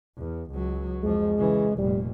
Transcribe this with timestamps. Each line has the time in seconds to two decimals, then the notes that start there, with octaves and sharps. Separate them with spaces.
0.17 E2
0.51 C#2 F#3
1.03 F2 F3 G#3
1.38 C#3 E3
1.78 F1 A#2 G3